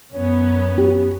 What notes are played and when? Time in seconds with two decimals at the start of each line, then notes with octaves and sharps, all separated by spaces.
0.13 F#2 B3 C#4 C#5
0.78 G4